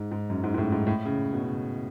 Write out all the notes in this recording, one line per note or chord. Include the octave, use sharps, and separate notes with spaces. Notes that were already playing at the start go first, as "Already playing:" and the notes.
Already playing: G#2
G#2
F#2
G#2
G#2
A2
G#2
A2
C#3
B2
C#3